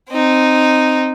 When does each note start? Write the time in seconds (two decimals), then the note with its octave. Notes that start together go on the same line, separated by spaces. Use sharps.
0.10 C4 D#4